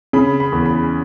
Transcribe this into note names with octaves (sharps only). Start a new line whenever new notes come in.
C#3 B5
B5
E2
B5